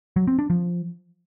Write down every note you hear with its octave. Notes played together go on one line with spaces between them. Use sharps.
F#3
C4
D4
F3